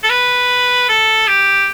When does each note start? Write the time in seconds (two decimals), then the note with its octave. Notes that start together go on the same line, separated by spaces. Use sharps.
0.03 A4
0.09 B4
0.89 A4
1.28 G4